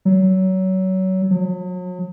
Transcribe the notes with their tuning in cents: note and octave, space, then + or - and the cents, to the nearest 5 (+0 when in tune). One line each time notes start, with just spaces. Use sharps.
F#3 +25
F#3 -40